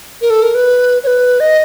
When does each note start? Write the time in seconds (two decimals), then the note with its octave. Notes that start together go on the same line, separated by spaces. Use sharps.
0.21 A#4
0.30 A4
0.42 A#4
0.55 B4
1.04 C#5
1.07 B4
1.40 D#5